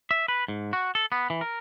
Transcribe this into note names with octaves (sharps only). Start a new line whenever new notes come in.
E5
B4
G#2
F#4
A4
B3
E3
A#4